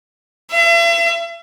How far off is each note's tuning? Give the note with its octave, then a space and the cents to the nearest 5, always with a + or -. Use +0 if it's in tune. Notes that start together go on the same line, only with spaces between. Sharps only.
E5 +40